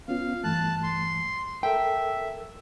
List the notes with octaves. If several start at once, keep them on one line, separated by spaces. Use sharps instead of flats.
B3 C#4 F4 F5
G2 E3 A3 A5 F#6
C6
A4 A#4 E5 G5